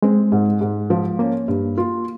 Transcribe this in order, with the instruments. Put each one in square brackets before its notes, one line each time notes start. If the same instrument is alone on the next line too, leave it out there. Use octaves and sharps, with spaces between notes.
[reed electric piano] G#3 [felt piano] C4
[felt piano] G#2
G#2
F3
[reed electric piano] A#3 [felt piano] C#4
[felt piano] G2
F4